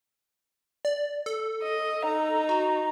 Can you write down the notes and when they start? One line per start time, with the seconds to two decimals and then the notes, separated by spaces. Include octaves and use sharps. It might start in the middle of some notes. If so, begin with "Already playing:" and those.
0.85 D5
1.26 A4
1.62 D#5
2.04 D#4 A#5
2.49 F#4